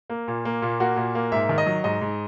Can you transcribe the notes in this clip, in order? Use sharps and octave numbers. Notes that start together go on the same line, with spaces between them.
A#3
A#2
A#3
A#2
A#3 F#4
A#2
A#3
G#2 E5
D#3
D#5
F#3
G#2 D#5
G#2